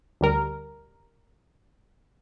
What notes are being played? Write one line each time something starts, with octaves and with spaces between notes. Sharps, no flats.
D2 G3 A#4